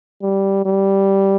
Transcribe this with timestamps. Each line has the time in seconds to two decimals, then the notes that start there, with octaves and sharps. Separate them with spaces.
0.22 G3
0.65 G3